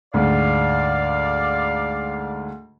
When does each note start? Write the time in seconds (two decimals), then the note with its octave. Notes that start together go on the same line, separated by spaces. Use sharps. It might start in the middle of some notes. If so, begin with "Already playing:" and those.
0.14 D2 G#2 D5 F5